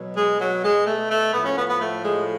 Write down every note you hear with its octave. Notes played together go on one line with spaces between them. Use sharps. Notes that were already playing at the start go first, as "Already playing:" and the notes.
Already playing: B2 F#3
G#3
F#3
G#3
A3
A3
A2 F3 B3
C#4
B3
B3
A3
G#3